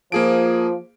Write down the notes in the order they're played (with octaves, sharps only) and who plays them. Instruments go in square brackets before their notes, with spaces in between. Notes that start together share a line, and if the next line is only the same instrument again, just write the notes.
[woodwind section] F3 [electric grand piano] A#3 G#4 D7